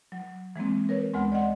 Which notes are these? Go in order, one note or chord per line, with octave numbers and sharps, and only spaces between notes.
F#3
E3 G#3 A#3 C4
A#4 B4 C#5
D2 G#3 B3 G#5 C6
D5 D#5 F#5 C6